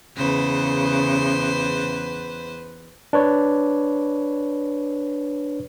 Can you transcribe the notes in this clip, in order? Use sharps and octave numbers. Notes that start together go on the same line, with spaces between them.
E2 C#3 B4 C5
D4 B4 C#5